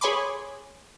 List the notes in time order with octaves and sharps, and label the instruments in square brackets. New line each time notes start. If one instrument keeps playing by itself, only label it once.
[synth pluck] G#4 C#5 G#5 B5 C6 D6